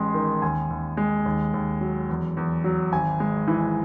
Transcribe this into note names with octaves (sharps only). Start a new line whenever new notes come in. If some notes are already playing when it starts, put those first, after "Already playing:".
Already playing: A1 G#3 C6
D#3
D#2 G#5
D#2
G#3
D#2
D#2
F#3
E2
E2
F#3
G#1 G#5
G#3
E3